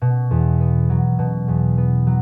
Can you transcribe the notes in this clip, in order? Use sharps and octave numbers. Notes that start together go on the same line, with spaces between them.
B2
E2
B3
F#3
B2
E2
B3
F#3